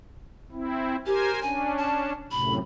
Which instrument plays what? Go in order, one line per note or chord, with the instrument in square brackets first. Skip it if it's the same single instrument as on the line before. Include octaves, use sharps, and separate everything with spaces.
[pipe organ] C4 E4
[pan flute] G4 [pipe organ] A#4 C5 G#5
[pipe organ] C#4 D4 [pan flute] G#5
[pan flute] A5
[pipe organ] F#2 A2 C3 [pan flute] B5